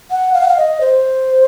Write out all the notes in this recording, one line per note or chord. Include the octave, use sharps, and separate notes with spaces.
F#5
F5
F#5
F5
D#5
C5